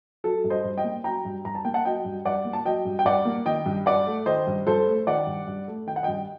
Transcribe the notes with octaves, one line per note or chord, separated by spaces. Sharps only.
F#3 A4
G2
C5 D#5
G2
D#5 G5
A#3
F#3 G5 A#5
G2
G2 A#5
A5
A#3 G5
F#5 A5
F#3 D#5 G5
G2
G2 D5 F#5
A#3
A5
F#3 D#5 G5
G2
G5
G2 D5 F#5
A#3
D#3 D#5 G5
G2
G2 D5 F#5
A3
D#3 C5 D#5
G2
G2 A4 C5
A3
D#3 D5 F#5
G2
G2
A3
D#3 G5
F#5
G2 D#5 G5